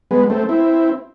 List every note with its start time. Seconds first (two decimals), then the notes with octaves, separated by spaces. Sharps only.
0.11 G#3 B3
0.30 A3 C4
0.49 C4 E4